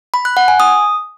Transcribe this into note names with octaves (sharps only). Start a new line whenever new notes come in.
B5
F#6
F#5
G#5
D#6